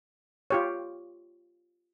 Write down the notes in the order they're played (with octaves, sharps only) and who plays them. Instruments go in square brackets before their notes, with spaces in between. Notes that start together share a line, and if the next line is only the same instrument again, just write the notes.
[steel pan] F4 G4 C#5